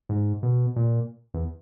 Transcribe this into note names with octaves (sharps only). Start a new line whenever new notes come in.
G#2
B2
A#2
E2